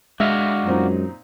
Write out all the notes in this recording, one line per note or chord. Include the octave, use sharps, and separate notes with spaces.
G#3 D4 F#4 E5 F5
F#2 A#2 C4 D#4